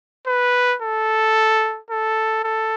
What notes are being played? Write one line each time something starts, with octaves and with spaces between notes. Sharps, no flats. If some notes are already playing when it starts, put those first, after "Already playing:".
B4
A4
A4
A4